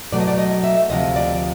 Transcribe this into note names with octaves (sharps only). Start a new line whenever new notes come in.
B2 F#3 A3 D5
D#5
D5
D#5
E5
D2 C3 F3 D#5
D5